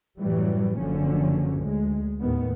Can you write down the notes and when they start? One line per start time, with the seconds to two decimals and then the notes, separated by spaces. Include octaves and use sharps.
0.19 F#2 A2 E3 F#3 G3
0.79 F#1 D3 F3 F#3 C#4
1.63 D2 G#3
2.21 D#2 A2 D#3 B3